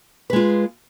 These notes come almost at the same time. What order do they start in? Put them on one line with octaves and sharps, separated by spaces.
B4 G#3 F4